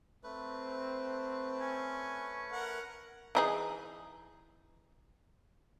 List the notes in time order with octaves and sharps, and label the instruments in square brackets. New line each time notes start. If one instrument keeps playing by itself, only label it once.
[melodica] A3 B4 [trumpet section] C4
[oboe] C#4 [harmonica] G#5
[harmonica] A#4 F#5
[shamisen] E3 D#4 G#4